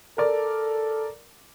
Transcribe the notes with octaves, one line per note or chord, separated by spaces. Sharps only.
A4 A#4 D5